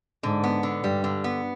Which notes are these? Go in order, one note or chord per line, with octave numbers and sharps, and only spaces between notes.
G#2 D3
B3
D3
G2 G3
D3
B3